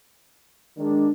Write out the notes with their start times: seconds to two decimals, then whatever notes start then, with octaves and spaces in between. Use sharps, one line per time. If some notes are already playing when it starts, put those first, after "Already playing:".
0.77 D#3 G#3 D4